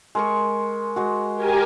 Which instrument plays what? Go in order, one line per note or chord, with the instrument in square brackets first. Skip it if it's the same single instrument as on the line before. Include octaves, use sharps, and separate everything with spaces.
[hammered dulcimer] G#3 A#4 C#6
G#3 F#4
[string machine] G4 A#4 G#5